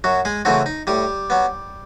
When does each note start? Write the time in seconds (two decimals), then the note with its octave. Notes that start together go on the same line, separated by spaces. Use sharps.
0.04 F#2 F#3 F#4
0.25 G#3 G#4
0.45 C#3 E3 F#3 A3 C4 F#4
0.66 D#4
0.87 A2 G3 G4
1.30 F#3 B3